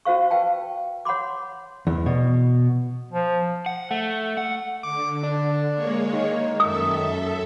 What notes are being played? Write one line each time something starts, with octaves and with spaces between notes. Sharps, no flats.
C#4 F#4 C5 F5 C#6
B4 F5 G5 A5
C#5 F#5 B5 C6 D6
E2
B2
F3
F#5
A3
F#5
D3 D6
D4
G#3 A#3 C#5
D#3
F#2 A4 E5 D#6